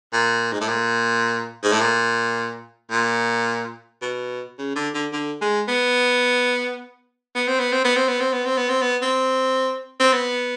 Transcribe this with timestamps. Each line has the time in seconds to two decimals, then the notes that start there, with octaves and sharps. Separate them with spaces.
0.13 A#2
0.52 G#2
0.61 A2
0.68 A#2
1.63 G#2
1.72 A2
1.80 A#2
2.91 A#2
4.02 B2
4.58 C#3
4.76 D3
4.94 D3
5.13 D3
5.42 G#3
5.68 B3
7.35 B3
7.48 C4
7.59 B3
7.72 C4
7.84 B3
7.96 C4
8.08 B3
8.20 C4
8.33 B3
8.46 C4
8.57 B3
8.69 C4
8.82 B3
9.02 C4
10.00 C4
10.13 B3